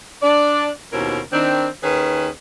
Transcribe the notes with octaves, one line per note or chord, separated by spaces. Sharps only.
D4 D5
D#2 B2 C#4 E4 A#4 C5
D#3 C4 D4
D#2 D#3 C#4 G#4 B4